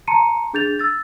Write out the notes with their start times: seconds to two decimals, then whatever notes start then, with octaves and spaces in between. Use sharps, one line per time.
0.08 A5 A#5 C6 C#7 D#7
0.54 D4 G#4 G6 A6 F7
0.79 E6 A6